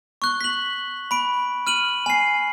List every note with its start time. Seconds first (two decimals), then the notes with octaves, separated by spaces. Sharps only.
0.22 C#6 F#6 G7
0.41 B6 F#7
1.11 B5 D7
1.67 F6 D#7 F#7
2.06 G#5 C7